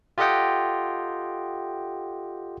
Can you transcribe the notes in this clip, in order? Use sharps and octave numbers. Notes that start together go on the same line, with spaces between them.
F4 G4 A4 D#5 F#5 G5